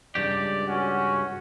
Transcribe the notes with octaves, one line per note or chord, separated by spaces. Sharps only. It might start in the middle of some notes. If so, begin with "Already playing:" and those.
C#2 G2 G4 D5
C#4 F#4